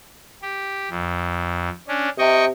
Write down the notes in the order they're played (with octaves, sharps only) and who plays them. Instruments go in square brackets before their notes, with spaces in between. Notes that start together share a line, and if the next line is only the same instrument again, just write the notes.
[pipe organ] G4
F2
C#4 D4
[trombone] C3 [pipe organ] D#5 G5 C#6